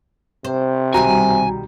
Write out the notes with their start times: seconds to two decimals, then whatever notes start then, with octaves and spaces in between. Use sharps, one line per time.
0.45 C3 C5
0.94 C2 B2 D#3 G3 F#4 G#5 A#5